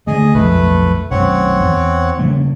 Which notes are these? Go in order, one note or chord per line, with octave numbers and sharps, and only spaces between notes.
D3 A3 G#4 D#5
B1 F2 A3 B4
B1 F#2 C4 C#5 F#5
E2
C#3 G3 A#3